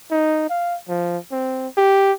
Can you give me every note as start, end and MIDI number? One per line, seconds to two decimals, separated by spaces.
0.11 0.46 63
0.50 0.77 77
0.89 1.18 53
1.32 1.68 60
1.77 2.12 67